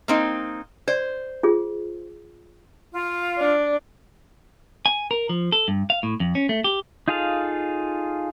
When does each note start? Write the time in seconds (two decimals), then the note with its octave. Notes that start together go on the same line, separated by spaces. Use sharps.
0.08 A#3 C4 D#4
0.88 C5 D5
1.43 F4 G#4
2.93 F4
3.39 D4
4.86 G#5
5.11 A#4
5.29 F3
5.52 A4
5.68 G2
5.90 F5
6.03 A2
6.20 F2
6.35 C#4
6.49 A3
6.64 G4
7.08 D#4 F4 G#4 A4 F5